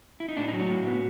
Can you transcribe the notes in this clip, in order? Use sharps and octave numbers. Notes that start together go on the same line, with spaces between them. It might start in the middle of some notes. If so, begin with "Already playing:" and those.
E4
D#4
A2 D4
D#4
F#3
F#4
A2
B3